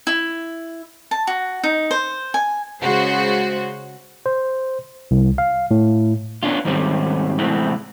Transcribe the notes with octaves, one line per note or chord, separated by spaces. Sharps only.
E4
A5
F#4
D#4
C5
G#5
C#3 G#3 F#4 C5
C5
C2
F5
A2
B3 C#4 D4 F4
D#2 G#2 D#3 G3 C4 C#4
C2 A2 E3 G#3 B3 C4